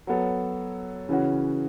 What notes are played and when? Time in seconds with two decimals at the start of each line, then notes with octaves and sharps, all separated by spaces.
0.07 F#3 B3 A4
1.09 C#3 E3 C#4 F#4